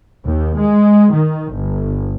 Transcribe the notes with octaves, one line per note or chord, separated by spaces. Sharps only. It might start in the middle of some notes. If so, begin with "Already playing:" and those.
D#2
G#3
D#3
G1